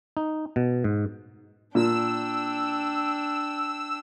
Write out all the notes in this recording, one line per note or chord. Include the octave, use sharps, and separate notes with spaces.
D#4
B2
G#2
A#2 D4 G5 E6